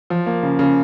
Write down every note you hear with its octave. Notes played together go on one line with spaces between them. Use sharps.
F3
A#3
C#3
C#3